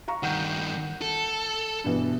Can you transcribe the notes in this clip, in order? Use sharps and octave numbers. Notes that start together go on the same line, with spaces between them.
F5 A#5 C#6
G2 D#3 F#5 G6
A4
G2 B2 E3